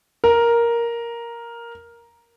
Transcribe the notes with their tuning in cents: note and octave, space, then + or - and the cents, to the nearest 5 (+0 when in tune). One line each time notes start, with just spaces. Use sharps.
A#4 +5